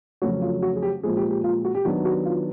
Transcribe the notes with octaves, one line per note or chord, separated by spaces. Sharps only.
F2 C#3 F#3 A3 C#4 F#4
F4
F#4
G#4
G4
A#2 F3 G#3 G#4
G4
G4
F4
F#4
G4
D#3 F#3 B3 D4 F#4
F#4
F4